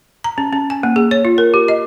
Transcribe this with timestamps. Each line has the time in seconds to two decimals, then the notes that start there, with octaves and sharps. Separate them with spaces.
0.24 A#5
0.38 C#4
0.53 C#4
0.70 G#5
0.83 A#3
0.96 G#4
1.11 C#5
1.25 F4
1.38 A#4
1.54 G4
1.68 D#5